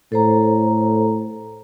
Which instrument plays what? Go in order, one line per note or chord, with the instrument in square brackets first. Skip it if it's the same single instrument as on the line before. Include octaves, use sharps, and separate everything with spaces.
[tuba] A2 [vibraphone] A4 C5 A#5